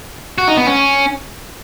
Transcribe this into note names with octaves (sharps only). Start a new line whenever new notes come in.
F#4
D#4
B3
C#4